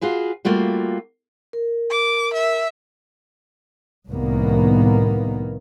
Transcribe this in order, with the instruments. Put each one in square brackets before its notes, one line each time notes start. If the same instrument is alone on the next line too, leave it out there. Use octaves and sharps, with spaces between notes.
[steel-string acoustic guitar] F4 F#4 G#4 B4
G3 A3 A#3 F4 F#4
[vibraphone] A#4
[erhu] D6
E5
[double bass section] C2 A2 D#3 A#3 B3